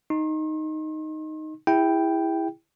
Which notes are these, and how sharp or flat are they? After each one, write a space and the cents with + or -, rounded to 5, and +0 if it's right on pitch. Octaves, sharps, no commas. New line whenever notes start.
D#4 +0 C6 +45
E4 +0 G#4 -40 G5 +0